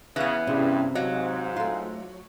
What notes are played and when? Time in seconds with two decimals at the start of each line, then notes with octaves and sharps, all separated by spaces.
0.16 C#3 E3 B3
0.47 G2 C3 C#4 E4 G#4
0.95 G#2 F#3 D#5 F5
1.57 A3 F4